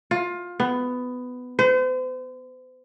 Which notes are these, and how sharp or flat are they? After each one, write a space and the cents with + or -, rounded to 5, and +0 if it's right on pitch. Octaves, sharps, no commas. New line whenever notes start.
F4 +20
B3 +15
C5 -40